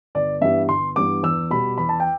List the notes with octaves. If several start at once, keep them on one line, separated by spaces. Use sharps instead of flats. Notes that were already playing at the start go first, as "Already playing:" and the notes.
G1 D5
G2 E3 G3 B3 E5
G1 C6
G2 E3 G3 B3 D6
E2 E6
B2 G3 B5
E2 B5
A5
G5